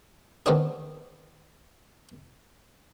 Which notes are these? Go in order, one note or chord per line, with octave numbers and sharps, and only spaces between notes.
D#3 B3 C4 D4 G#4